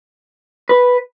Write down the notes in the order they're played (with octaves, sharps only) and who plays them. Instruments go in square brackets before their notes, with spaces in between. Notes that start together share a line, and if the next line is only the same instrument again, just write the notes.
[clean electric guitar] B4